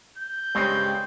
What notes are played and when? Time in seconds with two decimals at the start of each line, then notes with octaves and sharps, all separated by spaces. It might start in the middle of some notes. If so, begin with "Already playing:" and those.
0.18 G6
0.55 G2 C#3 G3 G#3 C4 C#4